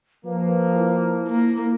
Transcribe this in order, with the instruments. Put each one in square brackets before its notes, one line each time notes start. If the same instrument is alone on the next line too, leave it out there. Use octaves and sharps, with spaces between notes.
[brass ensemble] F3 A#3 [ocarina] B4
[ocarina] E4
[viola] A#3